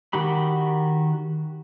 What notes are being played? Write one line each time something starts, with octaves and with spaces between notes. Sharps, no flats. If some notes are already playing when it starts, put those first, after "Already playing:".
D#3 F#4 G4 B5